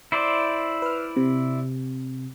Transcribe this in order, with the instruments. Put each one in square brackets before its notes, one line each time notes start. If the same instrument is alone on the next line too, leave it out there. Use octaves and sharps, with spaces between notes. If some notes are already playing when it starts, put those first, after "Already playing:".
[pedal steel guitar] E4 C5 D5
[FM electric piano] B4 F6
C3